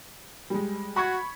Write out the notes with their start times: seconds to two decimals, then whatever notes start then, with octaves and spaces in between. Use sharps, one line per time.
0.50 G3 G#3
0.96 F#4 B5 C#6 G#6